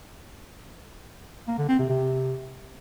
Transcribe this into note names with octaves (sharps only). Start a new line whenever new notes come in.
A#3
D3
C4
C3
C3